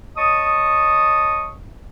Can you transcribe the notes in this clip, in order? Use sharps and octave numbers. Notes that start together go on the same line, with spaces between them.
C#5 D#5 A5 C#6 D#6